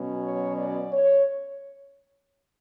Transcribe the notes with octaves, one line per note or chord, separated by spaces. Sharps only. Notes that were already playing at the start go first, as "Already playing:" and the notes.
Already playing: B2 F#3 C#4
C#5
D5
C#5